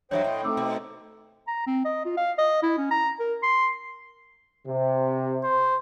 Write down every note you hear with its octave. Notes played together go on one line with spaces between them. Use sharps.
G2 E3 F#3 C5 C#5 D#5 E5 G5
A2
A3 C4 D#4 D6 E6
B2
A#5
C4
D#5
F4
F5
D#5
E4
C#4
A#5
A#4
C6
C3
C5